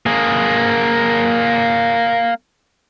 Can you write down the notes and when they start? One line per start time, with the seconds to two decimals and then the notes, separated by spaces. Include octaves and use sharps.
0.06 A#3 G#4